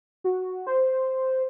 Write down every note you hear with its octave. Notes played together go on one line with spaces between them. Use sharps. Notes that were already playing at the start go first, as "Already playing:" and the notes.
F#4
C5